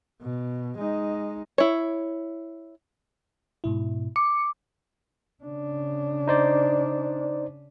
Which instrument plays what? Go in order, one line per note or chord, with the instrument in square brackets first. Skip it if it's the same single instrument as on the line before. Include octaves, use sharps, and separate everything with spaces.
[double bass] B2
G#3 D#4
[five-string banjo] E4 C#5
[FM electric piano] G#2 B2 E4
[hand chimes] D6 [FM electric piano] C#7
[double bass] C#3 D4
[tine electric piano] D#4 C5 D5